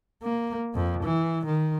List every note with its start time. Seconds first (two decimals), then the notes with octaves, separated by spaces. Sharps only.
0.23 A#3
0.75 F2
1.03 E3
1.46 D#3